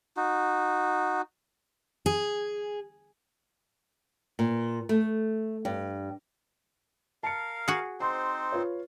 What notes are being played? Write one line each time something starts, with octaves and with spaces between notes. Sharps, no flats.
D#4 F#4
G#4
A#2
A3
G2
A#4 F5 A5 C#7
F#4 G#4
C4 D#4 C5 C6
F4 B4 C#5